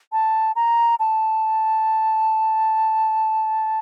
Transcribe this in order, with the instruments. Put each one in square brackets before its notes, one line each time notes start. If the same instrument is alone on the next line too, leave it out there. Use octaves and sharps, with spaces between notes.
[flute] A5
A#5
A5